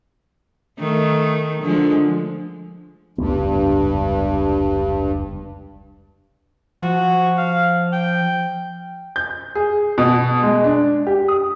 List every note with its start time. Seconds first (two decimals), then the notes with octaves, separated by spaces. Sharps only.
0.79 D#3 A3
1.62 D3 F3 G#3
3.18 F1 C#2 G2 B3
6.83 F3 F#4
7.38 F5
7.93 G5
9.16 G6
9.55 G#4
9.98 B2
10.43 G#3
10.64 D4
11.07 G4
11.28 D#6